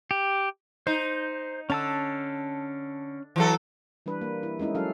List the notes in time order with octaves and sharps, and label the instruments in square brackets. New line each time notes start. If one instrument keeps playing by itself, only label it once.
[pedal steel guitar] G4
[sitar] D#4 [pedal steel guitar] C5
[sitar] D3 [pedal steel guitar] C#4 A5 E6
[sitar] E3 F#3 A4
[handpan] E3 G3 D4 B4
A#3
E4
G#3 C#4 D#4 E4
F#3 C#4 A4 F5